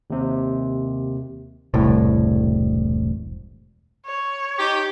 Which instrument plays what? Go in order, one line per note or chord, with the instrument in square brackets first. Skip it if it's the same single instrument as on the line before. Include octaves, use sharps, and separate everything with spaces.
[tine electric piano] D#2 C3
[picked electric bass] E1 C2 A2
[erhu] C#5
[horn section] D#4 G4